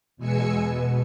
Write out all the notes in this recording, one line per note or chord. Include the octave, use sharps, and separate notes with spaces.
E2 B2 G#3 G#5 E6 C#7
B2